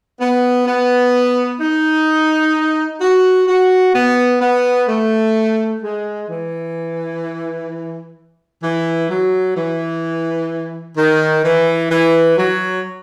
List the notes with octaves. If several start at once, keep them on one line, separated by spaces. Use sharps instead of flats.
B3
B3
D#4
F#4
F#4
B3
B3
A3
G#3
E3
E3
F#3
E3
D#3
E3
E3
F#3